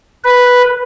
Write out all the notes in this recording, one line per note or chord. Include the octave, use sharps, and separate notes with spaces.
B4